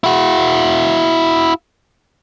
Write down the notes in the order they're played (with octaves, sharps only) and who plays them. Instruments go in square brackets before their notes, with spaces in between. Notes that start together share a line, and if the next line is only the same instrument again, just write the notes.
[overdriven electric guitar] E4 F#4